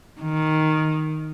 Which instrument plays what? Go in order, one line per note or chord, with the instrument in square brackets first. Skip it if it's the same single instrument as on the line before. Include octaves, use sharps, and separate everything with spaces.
[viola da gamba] D#3